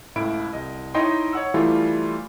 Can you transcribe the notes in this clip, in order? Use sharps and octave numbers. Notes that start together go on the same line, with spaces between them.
C#2 A2 E4 D7
C2 D#5
D#4 E4 C#5 D#5 G5 C6
C#5 F#5 E6
E3 G3 A3 E4 F4